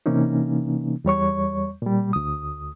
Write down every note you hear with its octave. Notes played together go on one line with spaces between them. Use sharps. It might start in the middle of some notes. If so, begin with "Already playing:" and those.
C3 E3 A#3 C#4 D#4
E2 G3 C#5 C#6
A#2 G3
D2 D#6